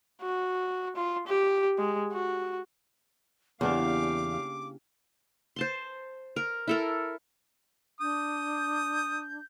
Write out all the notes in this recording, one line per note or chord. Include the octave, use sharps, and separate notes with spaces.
F#4
F4
G4
G#3
F#4
E2 C#3 A#3 D4 G4 F5 D6
C5 A5 C6
A#4
E4 A4 A#4
D4 D#6 G6